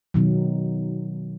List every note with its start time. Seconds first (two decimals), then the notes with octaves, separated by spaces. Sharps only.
0.14 B2 D#3 F#3